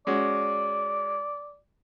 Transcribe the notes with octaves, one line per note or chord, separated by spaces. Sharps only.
G#3 C#4 F#4 D5